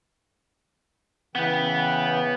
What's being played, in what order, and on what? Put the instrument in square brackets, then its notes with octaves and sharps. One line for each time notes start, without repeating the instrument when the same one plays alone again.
[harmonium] C#3 E3 G5 [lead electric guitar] B3 B4